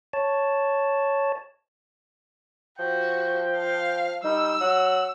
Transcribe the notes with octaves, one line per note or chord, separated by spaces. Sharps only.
C#5 A5
F3 F#4 G5
F5
G3 D#4 E6
F#3 F#5